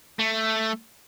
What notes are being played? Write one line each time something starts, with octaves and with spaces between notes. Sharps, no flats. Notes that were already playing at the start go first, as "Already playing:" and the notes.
A3